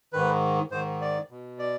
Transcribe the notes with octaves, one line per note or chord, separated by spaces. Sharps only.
G#2 D#3 B4
G#2 D#3 C5
D5
B2
D5